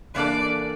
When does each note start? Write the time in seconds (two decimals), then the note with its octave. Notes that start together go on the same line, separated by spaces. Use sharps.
0.14 E3 A#3 D4 A4 D5